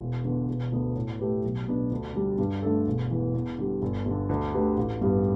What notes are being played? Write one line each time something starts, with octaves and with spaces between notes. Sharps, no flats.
E1
E2 D3
E1
D2 D3 B3
A2
A3 G4 B4
B1
B2 B3 D4 B4
D2
D3 G3 D4
G2
D3 A3 D4 A4
E1
E2 E3
E2
D3 G3
G1
G2 D3
D2
D3 A3 G4 B4
A1
G2 G3 B3